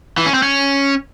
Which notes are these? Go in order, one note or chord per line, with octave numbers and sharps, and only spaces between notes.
E3
C#4
C4
C#4